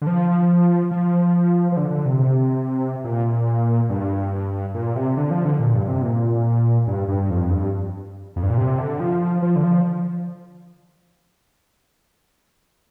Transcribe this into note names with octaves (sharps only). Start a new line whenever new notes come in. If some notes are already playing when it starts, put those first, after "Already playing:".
D3
F3
F3
F3
D3
D3
C3
C3
A#2
G2
A#2
C3
D3
F3
D3
A#2
G2
C3
A#2
G2
G2
F2
G2
F2
G2
A#2
C3
D3
F3
F3
D3
F3